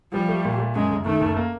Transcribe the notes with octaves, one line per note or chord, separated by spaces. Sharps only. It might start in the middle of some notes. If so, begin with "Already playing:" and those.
F3 G3
A3
A#2
A3
F#2 G#3
F#1
D#3 A3
F#1
A#3